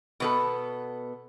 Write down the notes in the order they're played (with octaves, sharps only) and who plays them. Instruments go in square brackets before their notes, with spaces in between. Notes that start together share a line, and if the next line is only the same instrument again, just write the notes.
[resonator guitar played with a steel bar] B2 B3 A4